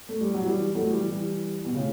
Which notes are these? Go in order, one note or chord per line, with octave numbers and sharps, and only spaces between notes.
A3
G3
F#3
E3 G3
F#3 A3
E3 G3
E3 G3
B2
A2 C#3